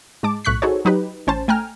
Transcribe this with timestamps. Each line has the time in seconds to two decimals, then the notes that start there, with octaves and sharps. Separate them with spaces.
0.23 G#2 G#3 A5 D6
0.45 B1 A2 C#6 F#6 B6
0.62 D#4 F#4 G#4 A4 C5 C#5
0.85 F#3 D#4 G4 B4
1.27 A1 C#4 C5 A5
1.48 A3 G5 G#5 A#5 F6